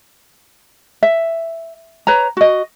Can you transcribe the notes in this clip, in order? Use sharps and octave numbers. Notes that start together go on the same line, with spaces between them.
E5
B4 C#5 A#5
F#4 D#5